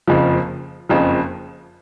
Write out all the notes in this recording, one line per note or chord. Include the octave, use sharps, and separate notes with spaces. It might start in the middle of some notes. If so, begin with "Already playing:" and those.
F#1 F2 C#3 F3
F#1 F2 C#3 F3